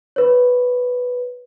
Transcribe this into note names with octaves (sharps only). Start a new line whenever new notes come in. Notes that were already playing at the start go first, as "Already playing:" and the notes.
B4 C#5